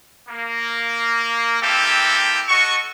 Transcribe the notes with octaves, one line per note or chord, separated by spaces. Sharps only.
A#3
A#3 C4 E4 G4 A4
F#4 A4 D#5 C#6